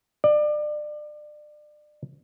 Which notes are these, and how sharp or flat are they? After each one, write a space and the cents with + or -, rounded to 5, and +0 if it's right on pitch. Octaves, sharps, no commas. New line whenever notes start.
D5 +30